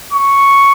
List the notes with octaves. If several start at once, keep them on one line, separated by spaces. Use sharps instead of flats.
C#6